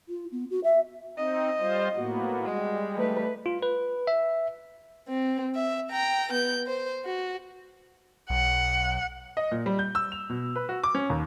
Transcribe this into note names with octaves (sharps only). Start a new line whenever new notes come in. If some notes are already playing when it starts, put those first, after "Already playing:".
F4
B3
F#4
E5
C4 D#4 D#5
G3 F4 C5
A2 A#3 B3 F#4
G3 G#3
A3 B4
F4
B4
E5
C4
E5
G5 A#5
B3 G6
C5
F#4
B1 F#5
D#5
A#2
G3
G6
E6
F7
B2
B4
F#4
D6
C#4
D#2